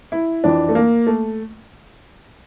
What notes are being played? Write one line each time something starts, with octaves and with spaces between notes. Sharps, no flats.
E4
F2 E3 D4
A3
A#3
A3